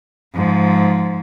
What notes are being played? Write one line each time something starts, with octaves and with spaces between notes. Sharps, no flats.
G#2 F3